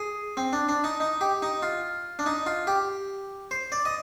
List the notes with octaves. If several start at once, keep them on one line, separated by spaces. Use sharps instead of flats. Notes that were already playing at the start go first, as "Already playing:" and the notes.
Already playing: G#4
C4
D4
D4
D#4
D#4
G4
D#4
F4
D4
D#4
F4
G4
C5
D5
D#5